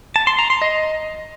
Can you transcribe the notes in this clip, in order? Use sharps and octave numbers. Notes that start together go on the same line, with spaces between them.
A5
C6
A#5
C6
D#5